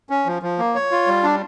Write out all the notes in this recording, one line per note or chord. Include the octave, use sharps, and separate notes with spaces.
C#4
F3
F3
A#3
C#5
F4
G3
D4